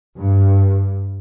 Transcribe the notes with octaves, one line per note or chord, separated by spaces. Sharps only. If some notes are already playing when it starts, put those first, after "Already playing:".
G2